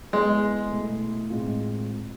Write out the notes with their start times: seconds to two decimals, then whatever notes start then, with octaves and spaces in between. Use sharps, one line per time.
0.13 G#3 B3 E4 G#4
0.72 B2 A3 E4
1.30 A2 G#3 C4 F4